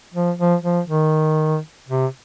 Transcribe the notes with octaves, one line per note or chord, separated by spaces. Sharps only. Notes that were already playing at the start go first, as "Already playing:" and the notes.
F3
F3
F3
D#3
C3